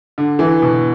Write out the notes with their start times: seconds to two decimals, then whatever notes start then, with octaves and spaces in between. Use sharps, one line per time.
0.18 D3
0.39 E3
0.62 B2